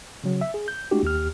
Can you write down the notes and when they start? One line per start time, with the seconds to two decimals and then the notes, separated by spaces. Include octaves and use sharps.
0.24 C#3 F#3
0.41 E5
0.54 G#4
0.68 G6
0.91 G#3 A3 D4 E4 F#4 G4
1.03 D#2 G4 F6